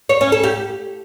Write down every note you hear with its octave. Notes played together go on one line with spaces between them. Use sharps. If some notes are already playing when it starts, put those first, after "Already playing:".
C#5
C#4
A4
G4